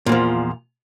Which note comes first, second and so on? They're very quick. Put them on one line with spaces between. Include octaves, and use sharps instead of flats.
A#2 E2 F3